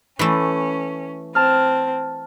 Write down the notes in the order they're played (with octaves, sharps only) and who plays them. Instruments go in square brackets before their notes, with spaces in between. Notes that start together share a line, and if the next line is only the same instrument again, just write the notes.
[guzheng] E3 A3 [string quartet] C#4
[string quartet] C4 [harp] A5 F6